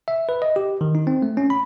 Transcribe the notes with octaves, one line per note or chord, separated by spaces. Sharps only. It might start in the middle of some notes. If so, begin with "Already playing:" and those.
E5
B4
D#5
G4
D#3
D#4
C4
A3
C#4
B5